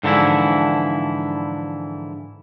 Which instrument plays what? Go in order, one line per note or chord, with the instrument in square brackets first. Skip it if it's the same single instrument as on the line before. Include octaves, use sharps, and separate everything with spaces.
[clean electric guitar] G#2 D3 E3 F3 E4